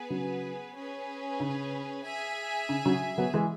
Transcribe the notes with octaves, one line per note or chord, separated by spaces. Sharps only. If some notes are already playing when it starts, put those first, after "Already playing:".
Already playing: B3 G#4 B4
C#3 F#3
C#4 G#4 B4
C#3
G#4 E5 G#5
C#3
C#3 F#3
F#3 B3
E3 G#3